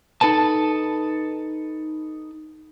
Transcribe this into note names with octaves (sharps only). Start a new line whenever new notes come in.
D#4 A4 B4 A5